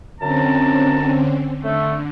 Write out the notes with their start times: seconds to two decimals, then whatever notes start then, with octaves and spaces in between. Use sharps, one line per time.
0.20 F#2 D3 C4 C#4 A5 A#5
1.63 D3 A3